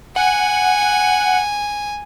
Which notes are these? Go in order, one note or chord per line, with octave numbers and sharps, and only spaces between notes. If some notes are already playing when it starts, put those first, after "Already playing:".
F#5 G#5